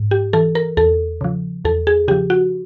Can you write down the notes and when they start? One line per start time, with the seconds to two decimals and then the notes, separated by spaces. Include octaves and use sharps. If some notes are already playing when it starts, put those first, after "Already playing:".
Already playing: G#2
0.11 G4
0.33 E3 A4
0.55 A#4
0.77 E2 A4
1.21 C#3 F3
1.65 E2 A4
1.87 G#4
2.08 C#3 G4
2.11 F3
2.30 F#4